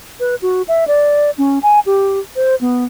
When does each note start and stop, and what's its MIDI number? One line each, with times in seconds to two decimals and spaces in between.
0.20 0.35 71
0.42 0.62 66
0.68 0.87 76
0.87 1.31 74
1.38 1.59 61
1.63 1.80 80
1.86 2.20 67
2.36 2.55 72
2.61 2.85 59